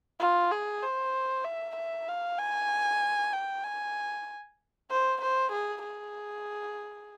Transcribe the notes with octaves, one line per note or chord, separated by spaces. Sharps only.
F4
G#4
C5
E5
E5
F5
G#5
G5
G#5
C5
C5
G#4
G#4